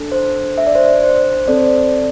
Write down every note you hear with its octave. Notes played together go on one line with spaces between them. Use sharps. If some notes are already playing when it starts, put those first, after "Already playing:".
Already playing: D4 A4
C5
E5
D5
C5
D5
C5
C4 A4 D5
C5
D5